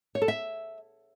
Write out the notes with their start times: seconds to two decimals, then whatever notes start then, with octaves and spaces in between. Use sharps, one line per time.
0.15 C#5
0.22 A4
0.28 E5